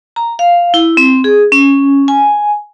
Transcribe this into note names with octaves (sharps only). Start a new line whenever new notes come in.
A#5
F5
E4
C4
G#4
C#4
G#5